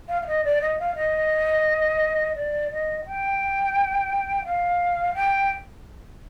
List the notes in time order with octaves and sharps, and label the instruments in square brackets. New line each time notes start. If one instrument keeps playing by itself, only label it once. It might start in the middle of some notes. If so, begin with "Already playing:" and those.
[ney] F5
F5
D#5
D5
D#5
F5
D#5
D5
D#5
G5
F5
G5